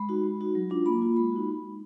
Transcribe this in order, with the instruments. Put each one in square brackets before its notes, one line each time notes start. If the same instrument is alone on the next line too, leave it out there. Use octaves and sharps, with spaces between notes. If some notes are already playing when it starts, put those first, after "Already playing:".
Already playing: [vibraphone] G#3 B5
D#4 F#4
G#3
D#4 F#4
F#3
D4 F4
A#3 B5
F4
G#3 B5
D#4 F#4